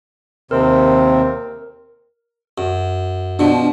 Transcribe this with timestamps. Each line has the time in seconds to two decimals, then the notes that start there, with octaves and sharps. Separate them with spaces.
0.51 D#2 C3 C4 A#4
2.58 F#2
3.39 B2 F3 D4